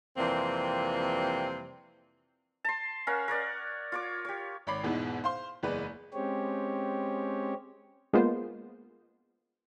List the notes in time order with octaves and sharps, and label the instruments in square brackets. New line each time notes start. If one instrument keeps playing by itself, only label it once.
[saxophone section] F2 C3 E3 G3 A#3 C4
[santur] A5 C6
C#4 A#4 F5 F#5
A#4 C#5 D5 F#5
F4 C#5 D6
G4 C#5
[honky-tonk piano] G#1 C#5 B5 D6 C7
E2 G#2 B2 G#3 B3 E4
C5 F5 C6
F#1 E2 G#3 B4 D5
[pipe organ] G#3 C4 C#4 G4 C#5
[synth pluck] G#3 A#3 B3 F4 C5